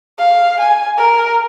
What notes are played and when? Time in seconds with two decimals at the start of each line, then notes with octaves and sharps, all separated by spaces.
0.18 F5
0.60 G#5
0.97 A#4